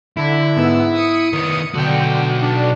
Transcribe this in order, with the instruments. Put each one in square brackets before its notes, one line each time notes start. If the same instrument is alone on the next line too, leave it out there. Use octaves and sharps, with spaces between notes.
[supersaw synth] D3 [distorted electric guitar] E4
[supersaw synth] G#2 B3 E6
D#6 C#7 D#7
[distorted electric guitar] D#3 B3
[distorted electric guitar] B1 F#4 [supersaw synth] D3 G5
[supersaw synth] D4